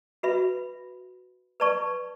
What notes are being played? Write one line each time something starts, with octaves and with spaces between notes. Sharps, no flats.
F#4 B4 E5 B5
B4 D5 A5 C#6